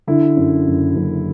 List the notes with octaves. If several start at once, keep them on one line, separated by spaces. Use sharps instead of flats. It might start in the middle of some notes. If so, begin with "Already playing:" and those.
D3 E4
F#2
F#1
F#1